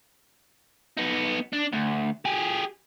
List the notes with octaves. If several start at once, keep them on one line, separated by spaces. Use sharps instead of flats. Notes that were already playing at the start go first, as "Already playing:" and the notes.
B3 D#4
D4
D2
G4 G#4